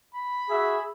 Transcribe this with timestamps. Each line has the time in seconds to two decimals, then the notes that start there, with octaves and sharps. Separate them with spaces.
0.14 B5
0.49 F#4 G#4 E5